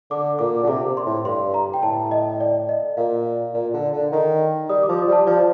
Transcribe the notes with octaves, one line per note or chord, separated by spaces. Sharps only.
D3 D6
A#2 D6
D3
C3 D6
C6
A2
G2 C6
A#5
G5
A2 A5
D#5
D5
D#5
A#2 F5
A#2 F5
D3
D3
D#3
G3 D#6
D6
F3
D#6
G3 A5
F3 D5